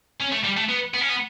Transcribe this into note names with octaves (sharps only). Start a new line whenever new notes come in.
C#4
A3
G3
A3
B3
B3
C#4
B3